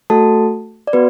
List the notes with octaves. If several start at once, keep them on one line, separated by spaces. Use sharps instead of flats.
A3 F#4 A4 A5
D5
B3 F#4 B4